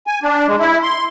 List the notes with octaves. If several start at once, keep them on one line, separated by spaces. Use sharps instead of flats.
G#5
D4
G#3
E4
C6